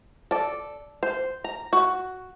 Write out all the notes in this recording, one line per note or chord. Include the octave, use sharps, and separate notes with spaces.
A4 D5
C5
A#5
F#4